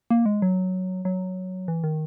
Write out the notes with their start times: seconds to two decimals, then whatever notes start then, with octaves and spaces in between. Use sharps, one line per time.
0.11 A#3
0.26 G#3
0.42 F#3
1.05 F#3
1.68 E3
1.84 D#3